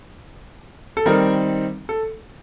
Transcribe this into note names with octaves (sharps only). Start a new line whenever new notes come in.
A4
D#3 G3 C4 D#4 A#4
A4